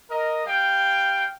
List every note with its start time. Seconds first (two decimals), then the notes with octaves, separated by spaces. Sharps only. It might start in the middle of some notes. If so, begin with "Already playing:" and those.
0.11 A#4 D#5
0.46 G3 F5 G5